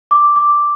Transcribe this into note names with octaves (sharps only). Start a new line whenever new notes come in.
D6
D6